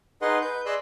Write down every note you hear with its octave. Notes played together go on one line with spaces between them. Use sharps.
D#4 G#4 B4 D#5 F#5 C6
B4 G6
G#4 D5 D#5 C6 E6 F#6